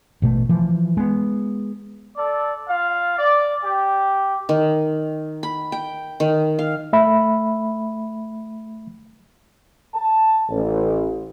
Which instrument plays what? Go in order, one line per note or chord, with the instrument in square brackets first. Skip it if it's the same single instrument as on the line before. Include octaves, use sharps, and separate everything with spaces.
[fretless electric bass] A1 B2 A3
E3 F3
G#3 B3
[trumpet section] A4 D5
F4 F5
D5
G4
[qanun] D#3
B5
G5
D#3
F5
[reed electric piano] A3 E5 B5
[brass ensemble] A5
A1